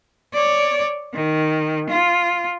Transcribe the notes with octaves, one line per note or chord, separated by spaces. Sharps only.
C#5 D5
D#3
F4